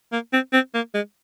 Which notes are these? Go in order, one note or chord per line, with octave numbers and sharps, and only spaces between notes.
A#3
C4
C4
A#3
G#3